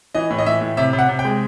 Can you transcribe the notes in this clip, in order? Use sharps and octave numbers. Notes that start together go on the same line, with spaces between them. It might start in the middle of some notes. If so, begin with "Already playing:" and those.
E3 D#5
A2
D#5
E3 E5
A2
C3 E5
C3
F#5
C3
G5
G#3